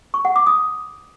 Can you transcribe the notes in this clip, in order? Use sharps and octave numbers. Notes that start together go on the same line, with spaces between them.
C#6
F#5
D6
D#6